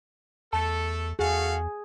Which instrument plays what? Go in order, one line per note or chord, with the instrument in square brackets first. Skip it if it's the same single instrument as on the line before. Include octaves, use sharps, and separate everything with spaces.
[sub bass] E2 [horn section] A3 A4 [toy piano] A5
[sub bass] E2 [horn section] A3 F#4 F5 [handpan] G#4